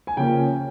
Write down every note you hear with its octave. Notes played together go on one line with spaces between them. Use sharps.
G#5
C#3 F3 A#3 C#4 G5